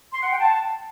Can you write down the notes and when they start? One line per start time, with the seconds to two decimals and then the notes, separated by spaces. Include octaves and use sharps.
0.13 C6
0.22 F#5
0.31 G5
0.40 A5